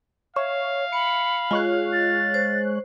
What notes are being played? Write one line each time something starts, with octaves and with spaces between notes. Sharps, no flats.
C#5 E5 F5
B5 C#7
G#3 F4 C#5 F#6
A6
C5